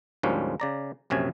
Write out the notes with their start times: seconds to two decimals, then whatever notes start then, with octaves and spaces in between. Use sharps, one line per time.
0.23 D2 G#2 F3 G3 A#3 C#4
0.60 C#3 D5 A#5
1.10 A#1 F#2 C3 C#4 G#5